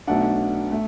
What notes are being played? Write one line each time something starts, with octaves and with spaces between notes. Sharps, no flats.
B1 B2 A3 D4 F#5
A3